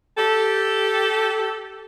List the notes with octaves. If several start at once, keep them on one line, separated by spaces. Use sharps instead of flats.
G4 A4